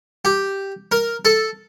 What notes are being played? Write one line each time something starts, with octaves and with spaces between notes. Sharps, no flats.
G4
A#4
A4